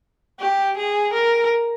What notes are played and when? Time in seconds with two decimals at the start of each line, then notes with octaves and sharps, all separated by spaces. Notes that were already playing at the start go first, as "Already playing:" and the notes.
0.40 G4
0.78 G#4
1.14 A#4